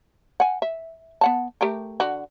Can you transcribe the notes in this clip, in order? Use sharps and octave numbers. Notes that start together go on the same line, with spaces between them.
F#5 G#5
E5
B3 F#5 A5
A3 G4 A#4
D3 F#4